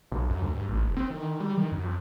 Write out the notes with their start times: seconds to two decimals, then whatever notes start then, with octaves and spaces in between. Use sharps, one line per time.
0.12 B1
0.29 F#2
0.42 D2
0.55 G2
0.68 A1
0.84 F1
0.97 C4
1.10 D#3
1.40 G3
1.57 D#3
1.72 F#2
1.85 F2